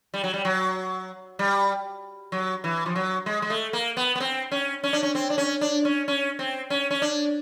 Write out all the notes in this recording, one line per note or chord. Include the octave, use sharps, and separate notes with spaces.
G3
F#3
G3
F#3
G3
F#3
E3
F3
F#3
G#3
G#3
A3
A#3
B3
B3
C4
C#4
C#4
D4
C#4
C4
D4
C#4
D4
C#4
C#4
C4
C#4
C#4
D4